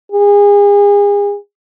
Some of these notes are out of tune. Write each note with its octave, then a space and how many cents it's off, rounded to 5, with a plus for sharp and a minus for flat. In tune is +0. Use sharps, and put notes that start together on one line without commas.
G#4 -35